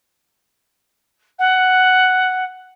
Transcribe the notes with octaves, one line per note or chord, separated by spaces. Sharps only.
F#5